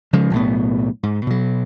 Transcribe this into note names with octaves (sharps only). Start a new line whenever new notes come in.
C#3 F3 G#3
B1 A2 B3
G#2
B2 F#3